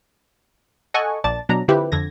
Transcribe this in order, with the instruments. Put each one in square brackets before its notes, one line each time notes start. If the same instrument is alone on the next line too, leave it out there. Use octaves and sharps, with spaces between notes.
[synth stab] A4 D#5 F#5 G#5 C#6
A#1 D5 A5 A6
B2 F#3 D4 A#5
D3 F3 C4 E4 G4 B4
F2 D3 G#6 A#6